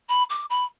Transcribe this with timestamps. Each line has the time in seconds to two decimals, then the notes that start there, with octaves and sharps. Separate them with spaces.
0.08 B5
0.29 D6
0.49 B5